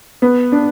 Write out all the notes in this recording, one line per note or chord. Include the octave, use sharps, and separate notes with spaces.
B3
D4